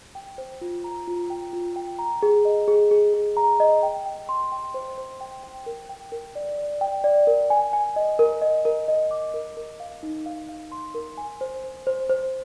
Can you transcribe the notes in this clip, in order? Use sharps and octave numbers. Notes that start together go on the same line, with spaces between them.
G5
C5
F4
A#5
F4
G5
F4
G5
A#5
G#4
D#5
G#4
G#4
G#4
A#5
D#5
G5
G5
C6
G5
C5
C5
G5
G5
A#4
G5
A#4
D5
D5
G5
D5
A#4
G#5
G#5
D#5
A#4
D#5
A#4
D#5
D6
A#4
A#4
F5
D#4
F5
F5
C6
A#4
G#5
C5
C5
C5
C5